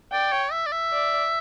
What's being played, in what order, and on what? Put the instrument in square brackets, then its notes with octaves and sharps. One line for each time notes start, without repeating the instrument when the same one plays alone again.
[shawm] D5 [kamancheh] G5
[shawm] C#5
E5
D5
E5
[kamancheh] D5